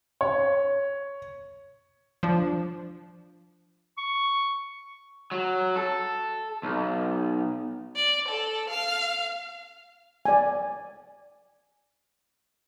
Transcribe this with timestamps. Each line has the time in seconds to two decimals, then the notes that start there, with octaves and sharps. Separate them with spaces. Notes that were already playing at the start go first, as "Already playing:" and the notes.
0.21 C#5
2.23 F3 D4
3.98 C#6
5.32 F#3
5.76 A4
6.63 B1
7.96 D5
8.28 A4
8.70 F5
10.26 D5 G#5